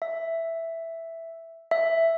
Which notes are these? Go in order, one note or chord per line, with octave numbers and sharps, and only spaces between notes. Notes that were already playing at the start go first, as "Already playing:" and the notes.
E5
E5